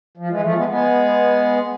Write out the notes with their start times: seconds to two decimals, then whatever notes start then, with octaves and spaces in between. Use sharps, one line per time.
0.17 F3
0.30 E3 G#3
0.42 F3 A3
0.56 G#3 B3
0.68 G#3 B3